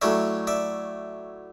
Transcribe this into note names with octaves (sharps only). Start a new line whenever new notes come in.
A2 F#3 A3 C#4 D5 E5
D5 E5